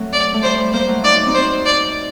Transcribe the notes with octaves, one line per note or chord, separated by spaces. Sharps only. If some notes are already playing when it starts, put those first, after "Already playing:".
Already playing: F#3 A3 C4
D5
A3
G3 C5
G3
G3 A#3 C5
F#3 A3
D#4 D5
F#4
C4 D#4
C5
D5